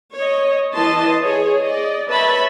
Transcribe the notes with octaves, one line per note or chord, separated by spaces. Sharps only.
C#5 D#5
E3 D#5 A5 C6
G#4 C#5
D5 D#5
B4 C#5 E5 A5 B5